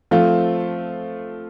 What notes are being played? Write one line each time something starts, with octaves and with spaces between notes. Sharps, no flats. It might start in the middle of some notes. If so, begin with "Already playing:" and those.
F3 A3 C4 F4